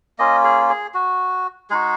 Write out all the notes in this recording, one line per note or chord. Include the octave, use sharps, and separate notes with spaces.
A#3 C#4 F4 D#5
G#4
G#4
F#4
G#3 D#4 F#4 G#4